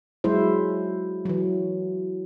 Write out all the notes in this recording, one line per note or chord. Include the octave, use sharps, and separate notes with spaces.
F#3 G#3 E4 C5
E3 F#3